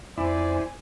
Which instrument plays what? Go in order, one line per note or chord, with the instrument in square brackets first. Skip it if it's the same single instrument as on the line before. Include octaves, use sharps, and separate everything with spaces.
[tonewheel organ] F2 C4 [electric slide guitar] E4 [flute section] C5 G#5 [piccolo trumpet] D5